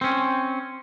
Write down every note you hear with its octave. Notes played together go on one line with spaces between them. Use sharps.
C4 C#4